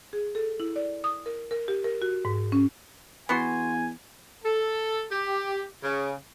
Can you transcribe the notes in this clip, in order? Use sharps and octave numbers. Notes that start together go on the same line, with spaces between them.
G#4
A4
E4
D5
D#6
A#4
A#4
G4
A#4
F#4
G#2
C#4
E2 B3 F#4 G#5 C6
A4
G4
C#3